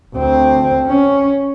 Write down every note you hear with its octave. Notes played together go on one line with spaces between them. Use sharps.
D2 C4
C#4